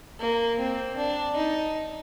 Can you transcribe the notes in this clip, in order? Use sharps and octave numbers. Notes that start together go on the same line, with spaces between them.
A#3
C4
D4
D#4